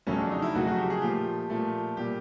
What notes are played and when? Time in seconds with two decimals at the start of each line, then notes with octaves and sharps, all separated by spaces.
0.07 F2 C#3 F#3 A3 C#4
0.19 D4
0.31 D#4
0.42 E4
0.54 F2 C#3 F#3 A3 F#4
0.67 F#4
0.78 G4
0.90 G#4
1.02 A#2 F3 A3 G4
1.50 A#2 F3 A3
1.97 A#2 G3 G4